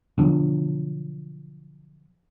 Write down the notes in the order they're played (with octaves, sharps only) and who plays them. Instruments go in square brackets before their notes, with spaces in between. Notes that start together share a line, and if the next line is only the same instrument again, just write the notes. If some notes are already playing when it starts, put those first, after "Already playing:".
[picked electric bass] B2 D3 F3 F#3